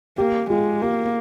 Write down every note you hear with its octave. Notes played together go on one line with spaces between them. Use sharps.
A#3 G4
G#3 F4 G#4
A#3 G4